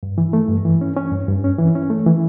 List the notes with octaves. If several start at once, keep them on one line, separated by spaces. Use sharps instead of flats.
G2
E3
A3
G2
E3
C#4
C#4
G2
G2
C#4
E3
C#4
A3
E3